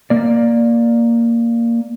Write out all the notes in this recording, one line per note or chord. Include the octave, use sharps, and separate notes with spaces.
A#3 D5